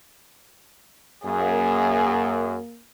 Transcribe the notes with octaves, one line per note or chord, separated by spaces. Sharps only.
F#2 A#3 G#4